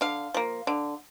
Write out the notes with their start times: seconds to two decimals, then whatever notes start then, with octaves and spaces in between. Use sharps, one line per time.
0.01 D3 F5
0.34 F3 A#3
0.67 D3